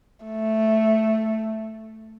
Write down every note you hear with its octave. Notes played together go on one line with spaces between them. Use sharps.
A3